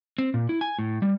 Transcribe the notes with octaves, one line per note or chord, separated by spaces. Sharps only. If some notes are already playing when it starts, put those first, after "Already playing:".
C4
A#2
E4
G#5
A2
G3